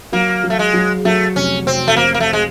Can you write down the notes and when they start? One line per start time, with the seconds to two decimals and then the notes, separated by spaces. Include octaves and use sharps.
0.12 F#3 A#3
0.44 F#3
0.50 A3
0.59 G#3
0.74 F#3
1.05 F#3 A3
1.36 F1 C#4
1.66 F1 C4
1.88 A3
1.97 F1 A#3
2.14 A#3
2.20 A3
2.33 G#3